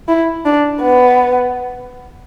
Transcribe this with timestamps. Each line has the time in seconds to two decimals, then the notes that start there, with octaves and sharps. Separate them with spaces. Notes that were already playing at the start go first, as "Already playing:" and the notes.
0.08 E4
0.45 D4
0.81 B3